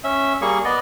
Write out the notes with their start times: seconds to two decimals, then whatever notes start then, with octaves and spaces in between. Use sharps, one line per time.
0.04 C#4 E5
0.41 G3 A#3 G#4 C#6
0.65 B3 D5 D#5